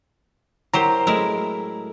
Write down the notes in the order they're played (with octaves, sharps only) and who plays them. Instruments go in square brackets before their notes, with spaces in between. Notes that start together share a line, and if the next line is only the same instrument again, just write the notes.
[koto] F#3 G4 C5 [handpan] E4 A#4 [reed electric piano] A#5
[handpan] F#3 A3 [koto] G#3 E4 A#4